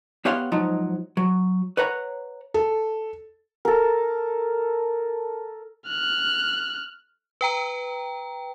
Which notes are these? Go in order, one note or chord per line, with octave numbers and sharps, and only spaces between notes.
B3 G4 C#5 F5 F#5 C6
G#2 F3 F#3 D#4
F#3
B4 C#5 F#5 A#5
A4
A4 A#4
F6 F#6
B4 G5 A#5